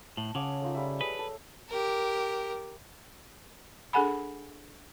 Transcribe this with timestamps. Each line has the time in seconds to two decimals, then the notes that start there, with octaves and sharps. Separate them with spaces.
0.17 A2 A5
0.35 C#3 C#5 F#5 D6
0.62 A3 D#4 F4
0.75 G3 E5
1.01 G#4 B4
1.19 A4
1.69 G4 A#4
3.93 D4 G#4 A4 F#5 G#5 B5